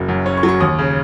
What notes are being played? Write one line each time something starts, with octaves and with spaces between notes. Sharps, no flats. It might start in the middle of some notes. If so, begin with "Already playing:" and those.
Already playing: F#1 F#3
F#2
C#4 C#5
C#6
F#3
C#6
D#2 D#6
C#3